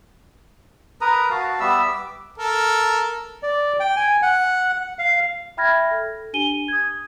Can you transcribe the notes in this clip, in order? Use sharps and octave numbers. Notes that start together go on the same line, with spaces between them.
A#4 B4 A#5 D#6
F#4 F5 A5
G3 B3 E5 E6
D6
A4 A#4
D5
G5
G#5
F#5
F5
E5 G5 B5 F6 G#6 A#6
A4
D4 G4 G#5 D#7 G7
D#6 G#6